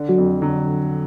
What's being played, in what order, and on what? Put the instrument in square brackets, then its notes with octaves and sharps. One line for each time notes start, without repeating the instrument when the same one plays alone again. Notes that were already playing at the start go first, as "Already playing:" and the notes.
Already playing: [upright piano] D3
[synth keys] F#3 F#4
[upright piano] F2
[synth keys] D3 D4 [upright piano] F#3